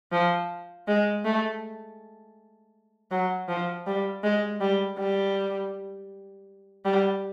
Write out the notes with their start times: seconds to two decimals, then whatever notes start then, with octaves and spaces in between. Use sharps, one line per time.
0.12 F3
0.88 G#3
1.25 A3
3.11 F#3
3.48 F3
3.87 G3
4.23 G#3
4.61 G3
4.98 G3
6.85 G3